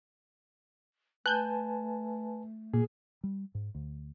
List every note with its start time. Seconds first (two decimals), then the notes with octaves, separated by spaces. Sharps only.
1.26 A3 B4 G#5 A5 F#6 G6
2.74 A#2 G#4
3.23 G3
3.55 G#2
3.75 D2